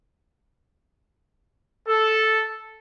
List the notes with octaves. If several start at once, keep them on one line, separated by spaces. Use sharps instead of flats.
A4